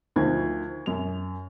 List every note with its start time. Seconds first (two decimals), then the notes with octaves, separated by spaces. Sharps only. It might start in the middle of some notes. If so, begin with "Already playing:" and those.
0.16 D2 D#3 F3 G#6
0.86 F#2 F7